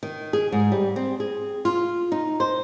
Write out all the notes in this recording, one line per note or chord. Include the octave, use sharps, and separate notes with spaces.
D#3
G#4
G#2
G3
C4
G#4
F4
D#4
C5